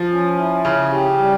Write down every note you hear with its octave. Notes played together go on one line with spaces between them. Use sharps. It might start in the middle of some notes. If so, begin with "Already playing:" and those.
Already playing: F3
C#4
E4
C#3 C#4
G4
G3